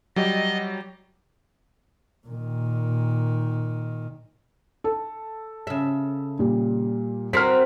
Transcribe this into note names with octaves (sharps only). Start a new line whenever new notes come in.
F#3 G3 G4 D#5
A#2 D#3
A4
C#3 E5
A#2 G3
C4 F#4 A#4 F6 B6